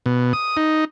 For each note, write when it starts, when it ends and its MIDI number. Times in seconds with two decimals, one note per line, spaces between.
0.06 0.33 47
0.33 0.57 87
0.57 0.85 63